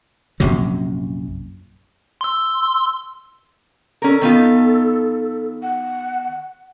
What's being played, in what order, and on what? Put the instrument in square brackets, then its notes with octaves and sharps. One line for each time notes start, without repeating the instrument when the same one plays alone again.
[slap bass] A#1 F#2 C3 F#3
[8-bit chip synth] C6 E6
[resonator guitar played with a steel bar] C#4 A#4 [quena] A4
[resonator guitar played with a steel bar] D#3 B3 F4
[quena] F#5